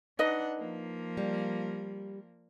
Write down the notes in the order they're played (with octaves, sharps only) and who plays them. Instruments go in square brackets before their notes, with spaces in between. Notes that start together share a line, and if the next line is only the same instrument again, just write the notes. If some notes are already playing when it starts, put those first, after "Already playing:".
[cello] D4 F#5 [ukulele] D#4 B4 D#5
[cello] F3 A#3
[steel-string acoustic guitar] G3